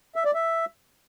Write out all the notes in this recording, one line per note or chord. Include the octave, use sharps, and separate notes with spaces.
E5
D5
E5